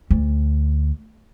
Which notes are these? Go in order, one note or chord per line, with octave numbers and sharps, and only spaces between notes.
D2